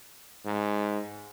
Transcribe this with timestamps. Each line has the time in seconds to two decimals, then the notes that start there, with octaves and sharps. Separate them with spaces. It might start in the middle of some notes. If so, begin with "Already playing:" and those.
0.46 G#2